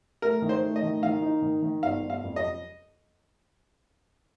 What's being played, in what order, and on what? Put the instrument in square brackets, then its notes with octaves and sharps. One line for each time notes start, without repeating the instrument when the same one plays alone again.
[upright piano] A3 [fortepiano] A#4
[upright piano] D#3
[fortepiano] C5
[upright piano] A3
[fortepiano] D#5
[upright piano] D#3
[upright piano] D#3 [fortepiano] F5
[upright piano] D#4
D#3
D#3
[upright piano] G1 [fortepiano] F5
[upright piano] G1
[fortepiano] F5
[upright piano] F2
[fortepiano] D#5